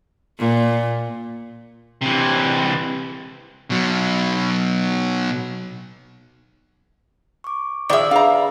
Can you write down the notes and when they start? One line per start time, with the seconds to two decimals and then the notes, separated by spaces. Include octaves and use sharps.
0.39 A#2
2.01 C3 E3
3.70 B2 F#3
7.44 C#6 D6
7.90 D#3 F3 G#4 D5 E5
8.11 D4 G#4 B4 F5 A#5